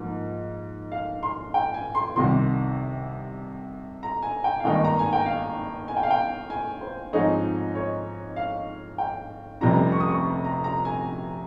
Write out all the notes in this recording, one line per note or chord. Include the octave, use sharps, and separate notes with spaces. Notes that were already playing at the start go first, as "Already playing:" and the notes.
Already playing: G#2 F3 A#3
F5
C6
G5
G#5
C6
C2 C3 D#3 C6
A#5
G#5
G5
F5
G#1 G2 D#3 A#3 D#4 G5
A#5
G#5
G5
F5
G#5
G5
F5
G5
G#5
C5
G#2 F3 G#3 C4 D#4 C#5
C#5
F5
G5
F1 F2 C3 G3 C#4 A#5
C#6
D#6
C#6
A#5
A#5
G#5